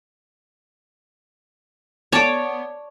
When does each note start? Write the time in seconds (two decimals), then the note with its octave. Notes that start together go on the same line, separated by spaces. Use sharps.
2.12 B3 C#5 D5 A5 D6